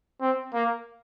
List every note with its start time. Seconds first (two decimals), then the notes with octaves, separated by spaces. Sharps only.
0.21 C4
0.53 A#3